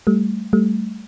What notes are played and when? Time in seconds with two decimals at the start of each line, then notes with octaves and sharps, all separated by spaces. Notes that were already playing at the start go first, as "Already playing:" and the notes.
0.07 G3 A3
0.53 G3 A3